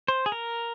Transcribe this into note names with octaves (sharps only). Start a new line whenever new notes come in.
C5
G#4
A#4